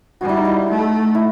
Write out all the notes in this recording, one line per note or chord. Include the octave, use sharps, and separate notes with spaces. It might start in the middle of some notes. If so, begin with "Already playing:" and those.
G3 F#4
E4
D#4
E4
A3 D#4
E4